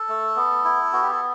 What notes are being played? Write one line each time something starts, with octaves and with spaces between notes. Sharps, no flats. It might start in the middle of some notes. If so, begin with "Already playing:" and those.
Already playing: A4
A3
B3
E4
B3 F#4
G4
A4